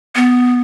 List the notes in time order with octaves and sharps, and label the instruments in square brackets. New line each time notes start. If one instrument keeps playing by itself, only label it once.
[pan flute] B3